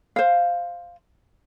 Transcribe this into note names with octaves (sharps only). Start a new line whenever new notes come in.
C5 F5